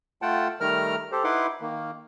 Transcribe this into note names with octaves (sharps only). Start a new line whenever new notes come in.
A3 F4 F#5 G5 A5
D#3 G3 A3 A#4 A#5 F6
G4 A4 C5
D#4 E4 B4 F#5 C6 D6
D#3 A#3